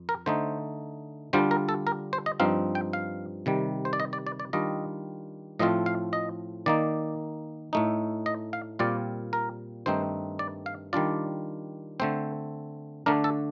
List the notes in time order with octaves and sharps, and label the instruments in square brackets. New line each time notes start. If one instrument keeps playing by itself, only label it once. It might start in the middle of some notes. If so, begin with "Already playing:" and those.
Already playing: [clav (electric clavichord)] F2
A#4
D3 A3 D#4 C5
D3 G3 D4 F4 C5
A#4
A4
A#4
C5
D#5
G2 F3 C4 D#4 F5
G5
F5
C3 D#3 G3
C5
D5
D#5
D5
D5
D5
D#3 G3 D4 F4 D#5
A2 F3 A3 C4 F4 D#5
F5
D#5
D#3 A#3 D#4 D5
A2 A3 D#4
D#5
F5
A#2 G3 C4 F4 D5
A#4
G2 D#3 A3 C4 D#4 C5
D5
F5
D#3 G3 D4 F4 D5
D3 A3 C4 C5
D3 A3 D4 A#4
A4